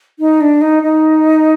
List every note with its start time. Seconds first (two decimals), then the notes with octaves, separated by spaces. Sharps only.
0.19 D#4
0.41 D4
0.61 D#4
0.83 D#4